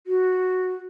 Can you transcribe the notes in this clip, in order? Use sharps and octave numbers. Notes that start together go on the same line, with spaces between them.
F#4